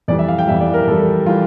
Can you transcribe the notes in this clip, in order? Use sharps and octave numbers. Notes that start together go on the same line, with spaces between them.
F2 E3 G3 D5
E5
F5
G5
F2 E3 G3 E5
D5
A#4
F2 E3 G3 A4
E3 G3 F4